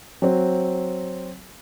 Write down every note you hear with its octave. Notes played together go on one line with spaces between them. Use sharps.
F#3 C4